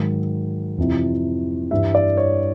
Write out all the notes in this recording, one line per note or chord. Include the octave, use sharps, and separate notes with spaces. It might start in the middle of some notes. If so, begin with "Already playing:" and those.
Already playing: G#2 D#3 F#3
F2 C3 E3
G2 E3 G3 E5
D5
C#5